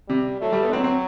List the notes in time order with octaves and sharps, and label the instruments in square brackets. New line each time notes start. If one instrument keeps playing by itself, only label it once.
[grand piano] C3 [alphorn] G3
[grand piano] F#3 [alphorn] A3
[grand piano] G3
B3
D4
[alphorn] F#3 [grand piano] C4
[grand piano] C4